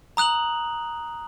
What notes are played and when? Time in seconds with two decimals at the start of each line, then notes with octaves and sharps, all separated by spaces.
0.17 A#5 D#6 F#6 F7 F#7